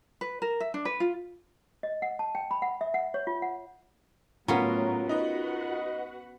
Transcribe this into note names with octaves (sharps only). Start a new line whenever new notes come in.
B4
A#4
E5
D4
B4
F4
D#5
F#5
A5
G5
B5
F#5
E5
F#5
C#5
F4
F#5
A2 F#3 B3 C#4 F4 A#4 A#5
D#4 F#4 B4 D#5 F#5